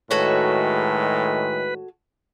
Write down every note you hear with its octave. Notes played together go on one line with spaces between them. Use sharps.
A2 D#3 G#3 F#4 A4 B4 C#5